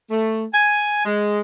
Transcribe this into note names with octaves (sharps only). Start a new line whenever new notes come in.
A3
G#5
G#3